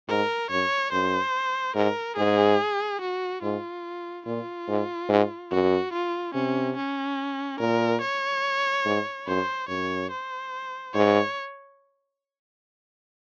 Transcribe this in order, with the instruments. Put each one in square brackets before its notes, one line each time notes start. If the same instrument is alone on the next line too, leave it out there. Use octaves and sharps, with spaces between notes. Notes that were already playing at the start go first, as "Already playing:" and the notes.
[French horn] G#2 [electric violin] A#4
[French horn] F#2 [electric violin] C#5
[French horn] F#2 [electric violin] C5
[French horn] G#2 [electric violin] A#4
[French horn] G#2 [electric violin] G#4
[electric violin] F#4
[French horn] G#2 [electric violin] F4
[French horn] A#2 [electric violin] F4
[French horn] G#2
G#2
[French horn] F#2 [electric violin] F#4
[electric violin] F4
[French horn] C3 [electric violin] C#4
[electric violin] C#4
[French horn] A#2 [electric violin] A#4
[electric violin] C#5
[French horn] G#2
[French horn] F#2 [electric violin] C5
[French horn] F#2 [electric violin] C#5
[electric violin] C5
[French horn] G#2 [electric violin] C#5